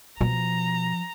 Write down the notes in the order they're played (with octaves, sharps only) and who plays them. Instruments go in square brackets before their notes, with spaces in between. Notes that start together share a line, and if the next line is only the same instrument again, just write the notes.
[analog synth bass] B2 [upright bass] F3 [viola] A#5